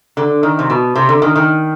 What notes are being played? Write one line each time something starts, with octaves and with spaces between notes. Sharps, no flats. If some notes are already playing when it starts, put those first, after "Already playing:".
D3
D#3
C3
B2
C3
D3
D#3
D#3